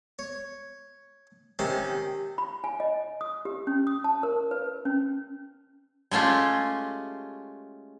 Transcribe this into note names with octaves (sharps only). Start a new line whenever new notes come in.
C#5
C3 D#3 C#4
B5
G#5
D#5
D#6
G4
C#4
D#6
A5
A#4
B4
C#4
G#3 A3 C#4 F4 G4